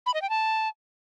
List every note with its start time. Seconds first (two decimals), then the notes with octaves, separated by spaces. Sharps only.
0.06 B5
0.14 D#5
0.22 G5
0.30 A5